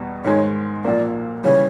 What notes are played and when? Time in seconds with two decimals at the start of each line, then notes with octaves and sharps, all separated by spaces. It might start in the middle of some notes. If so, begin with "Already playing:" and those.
Already playing: E2 B2 G3 B3
0.25 G#2 D#3 G#3 C#5
0.84 B1 A#2 F3 A#3 D5
1.44 C#3 E3 G3 C#5